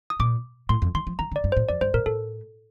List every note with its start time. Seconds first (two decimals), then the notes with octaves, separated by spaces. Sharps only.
0.10 D#6
0.20 A#2 D6
0.69 A2 C6
0.82 F2
0.95 D#3 C6
1.07 F3
1.19 D#3 A#5
1.32 D3
1.36 D5
1.44 G2
1.52 A2 C5
1.69 F2 D5
1.81 G2 C5
1.94 A2 A#4
2.06 A2 A4